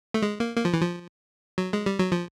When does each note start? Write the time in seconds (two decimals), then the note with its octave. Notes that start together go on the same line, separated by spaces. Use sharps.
0.14 A3
0.22 G#3
0.40 A#3
0.57 A#3
0.65 F3
0.73 E3
0.82 F3
1.58 F#3
1.73 G#3
1.86 G3
1.99 F#3
2.12 F3